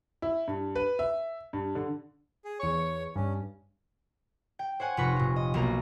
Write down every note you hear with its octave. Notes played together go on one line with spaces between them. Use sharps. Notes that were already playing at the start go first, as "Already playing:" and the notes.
E4
G2
B4
E5
G2
D3
G#4
E2 C#5 C#6
G2 C#4
G5
C5 C#5 F#5 G#5
F1 F4 B4 C#6 A#6
A#2 F4
D#5
B1 A#3 A#4 A#5